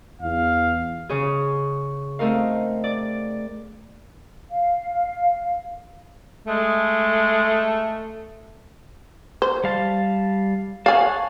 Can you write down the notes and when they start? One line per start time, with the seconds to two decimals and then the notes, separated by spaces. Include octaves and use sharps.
0.21 E2 F5
1.09 C#3 G#4
2.19 A3 C4 D#4 A#4 F5
2.84 D5
4.49 F5
6.47 G#3 A3
9.42 C5
9.64 G3 F5 A5
10.86 C#5 F5 F#5 G#5 A5